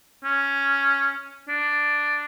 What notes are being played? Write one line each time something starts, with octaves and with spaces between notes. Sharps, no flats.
C#4
D4